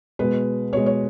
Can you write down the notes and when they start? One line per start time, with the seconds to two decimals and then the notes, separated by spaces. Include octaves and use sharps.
0.19 B2 G#3 B4
0.73 B2 G#3 C#5
0.86 C#5